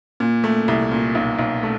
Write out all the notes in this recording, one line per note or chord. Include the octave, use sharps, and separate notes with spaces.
A#2
A3
C2
A#2
B1
B1
A3